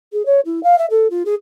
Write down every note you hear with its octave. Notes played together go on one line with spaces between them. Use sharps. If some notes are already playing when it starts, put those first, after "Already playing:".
G#4
C#5
E4
F5
E5
A4
F4
G#4